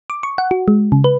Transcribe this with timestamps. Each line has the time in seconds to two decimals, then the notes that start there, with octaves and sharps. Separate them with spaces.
0.10 D6
0.23 C#6
0.38 F#5
0.51 F#4
0.68 G#3
0.92 C#3
1.04 B4